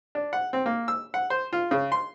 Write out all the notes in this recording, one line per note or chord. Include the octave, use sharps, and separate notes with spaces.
D4
F#5
C4
A#3
E6
F#5
C5
F4
C#3
C6